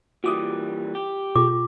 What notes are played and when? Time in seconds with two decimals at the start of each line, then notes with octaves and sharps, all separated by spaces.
0.24 A#2 E3 G3 F#4 D6 D#6
0.95 G4
1.36 B2 F4 D6